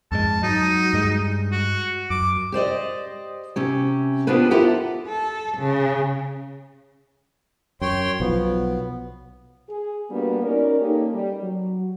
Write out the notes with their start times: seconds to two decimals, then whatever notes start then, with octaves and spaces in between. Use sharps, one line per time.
0.12 F2 G#2 G#3 A5
0.43 F#3 D#4
0.93 G2 G#3
1.51 F#4
2.10 F#2 D6
2.52 G4 C5 D5 D#5
3.56 C3 C#4 G4
4.27 B3 D4 F4 G4 B4 C5
4.51 E4 F4 G4 A4 A#4 F#5
5.06 A4
5.57 C#3
7.81 F#2 C#5 G5 C6
8.20 B1 F3 F#3 B3
9.69 G#4
10.10 G3 A#3 B3 D4 F#4
10.42 C#4 D#4 A#4 D5
10.79 A#3 C#4 D#4 G4 A4
11.12 G3
11.42 F#3